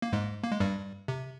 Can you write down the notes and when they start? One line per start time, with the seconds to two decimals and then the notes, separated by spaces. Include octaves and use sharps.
0.02 A#3
0.13 G#2 G#3
0.43 A#3
0.52 G#3
0.60 G2 G3
1.08 C3